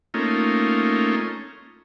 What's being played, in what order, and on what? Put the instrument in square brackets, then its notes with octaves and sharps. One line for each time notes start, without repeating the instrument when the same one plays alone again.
[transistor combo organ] A3 A#3 C#4 D#4 F4